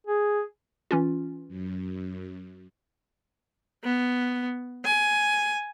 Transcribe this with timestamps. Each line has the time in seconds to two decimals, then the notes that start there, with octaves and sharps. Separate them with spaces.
0.07 G#4
0.91 E3 C#4 F4
1.48 F#2
3.84 B3
4.85 G#5